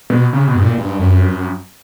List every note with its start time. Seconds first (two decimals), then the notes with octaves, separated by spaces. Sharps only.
0.10 B2
0.33 C#3
0.47 B2
0.55 G2
0.63 A#2
0.78 G2
0.99 F#2